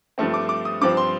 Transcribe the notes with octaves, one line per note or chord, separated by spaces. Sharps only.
G2 F3 A3 C4
D6
D6
D#6
G2 F3 C4 D6
C6